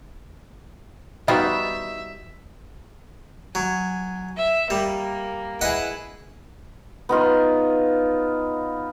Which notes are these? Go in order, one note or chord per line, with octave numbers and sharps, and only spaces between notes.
G3 B3 D#4 F4 F#4 C5 D#5 E5
F#3 G#5
E5
G3 A#3
E4 G#4 B4 D#5 F#5
B3 D#4 F4